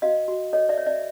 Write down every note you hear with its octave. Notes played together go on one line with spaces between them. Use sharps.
F#4 D#5 F5
F#4
A4 C#5 D#5
D5 E5
C#5
D5 E5